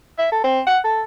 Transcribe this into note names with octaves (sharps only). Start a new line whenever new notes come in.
E5
A4
C4
F#5
A4